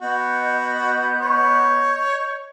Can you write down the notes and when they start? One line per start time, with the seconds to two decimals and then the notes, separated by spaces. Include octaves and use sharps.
0.01 B3 F#4 D#5 G6
1.21 C#5